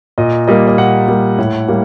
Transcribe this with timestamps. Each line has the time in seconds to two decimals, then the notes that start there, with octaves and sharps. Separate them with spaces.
0.18 A#2 D#5
0.48 G3 A#3 D#5
0.67 D#5
0.78 A#2 F#5
1.08 G3 A#3
1.38 A2
1.69 G3 A#3